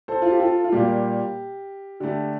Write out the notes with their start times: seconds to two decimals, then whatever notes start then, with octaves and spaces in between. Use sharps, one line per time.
0.08 A4 C5
0.22 F4
0.31 G4
0.40 F4 A4
0.65 F4
0.72 A#2 G3 A#3 G4
2.00 D3 A3 G4